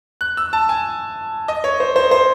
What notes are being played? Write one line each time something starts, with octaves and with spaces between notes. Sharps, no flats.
F#6
E6
A5
G#5
D#5
C#5
C5
C5
C5